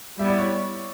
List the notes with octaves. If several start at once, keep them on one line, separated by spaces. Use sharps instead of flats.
G3 B3 E4 E5
D5
C#5